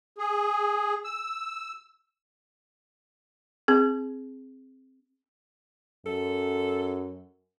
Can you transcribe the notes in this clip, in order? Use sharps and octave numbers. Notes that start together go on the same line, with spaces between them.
G#4
E6
C4 G#4
F#2 A4